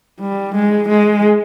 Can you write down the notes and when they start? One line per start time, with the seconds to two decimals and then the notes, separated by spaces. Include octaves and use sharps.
0.20 G3
0.55 G#3
0.89 G#3